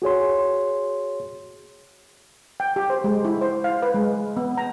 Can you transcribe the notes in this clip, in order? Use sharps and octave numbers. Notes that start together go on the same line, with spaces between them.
F#4 G#4 C#5 C6
G5
G4
C5
G#3
E4
C5
F5
B4
G#3
B3
A#5